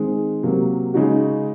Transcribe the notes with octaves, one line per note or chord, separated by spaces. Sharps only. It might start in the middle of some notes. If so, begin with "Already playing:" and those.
Already playing: D#3 G#3 C4
C3 F#3 A#3
C#3 G#3 D#4 F#4